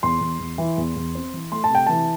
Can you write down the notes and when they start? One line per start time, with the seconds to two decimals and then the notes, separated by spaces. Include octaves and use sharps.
0.03 E2 C6
0.21 E2
0.39 E2
0.58 E3
0.78 E2
0.96 E2
1.15 C4
1.33 E3
1.52 A3 C6
1.64 A5
1.70 C3 G5
1.86 E3 A5